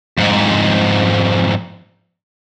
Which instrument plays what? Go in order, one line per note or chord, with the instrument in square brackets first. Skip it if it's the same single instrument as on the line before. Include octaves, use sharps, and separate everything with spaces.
[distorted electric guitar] F2 G#2